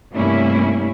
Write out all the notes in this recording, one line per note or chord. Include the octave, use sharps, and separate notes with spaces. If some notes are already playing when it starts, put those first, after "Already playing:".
G2 C3 A3 A#3 C#4 E4